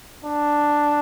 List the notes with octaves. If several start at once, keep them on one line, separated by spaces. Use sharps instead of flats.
D4